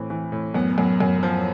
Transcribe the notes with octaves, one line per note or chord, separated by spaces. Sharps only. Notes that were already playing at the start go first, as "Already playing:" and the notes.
Already playing: A2 E3 C4
E3
A2
F#2 B3
F#2
F#2
F3